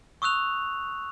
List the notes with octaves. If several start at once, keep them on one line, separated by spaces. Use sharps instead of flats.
C#6 D#6 E6 F#6 F7